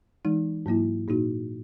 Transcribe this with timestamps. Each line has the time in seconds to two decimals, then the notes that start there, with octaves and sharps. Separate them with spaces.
0.25 E3 G#3 D#4
0.66 G#2 F#3 A#3 E4
1.08 A#2 A#3 D#4 F#4